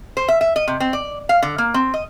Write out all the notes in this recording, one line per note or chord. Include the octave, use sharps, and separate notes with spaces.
C5
E5
E5
D#5
C3
C4
D5
F5
D3
A#3
C4
D#5